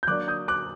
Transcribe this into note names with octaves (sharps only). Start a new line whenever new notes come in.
G6
F#3 A#3 D4 D6 F#6
D#6 G6
D6 F#6